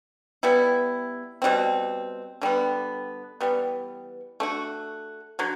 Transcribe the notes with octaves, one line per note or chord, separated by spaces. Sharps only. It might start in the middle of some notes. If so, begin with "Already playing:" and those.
G3 B3 E4
B2 G3 C4
D3 G3 B3
E3 G3 B3
A3 D4 F#4
D3 F#3